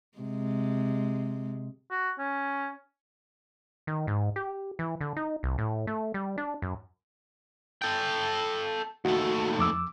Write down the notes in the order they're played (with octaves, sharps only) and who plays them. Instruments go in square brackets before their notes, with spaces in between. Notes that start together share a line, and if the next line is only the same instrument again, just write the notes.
[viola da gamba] C3 G#3
[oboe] F#4
C#4
[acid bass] D#3
G#2
G4
E3
D3
D#4
C2
A2
A3
G3
D4
F#2
[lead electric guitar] A4 G5
[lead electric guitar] D#2 A3 [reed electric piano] F#4
[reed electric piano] F2 D6 E6